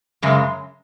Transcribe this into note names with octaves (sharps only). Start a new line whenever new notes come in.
F#2 C#3 G#3